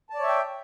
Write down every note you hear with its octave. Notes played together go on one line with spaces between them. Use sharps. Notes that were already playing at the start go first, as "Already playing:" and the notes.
C#5 D5 E5 G5 A5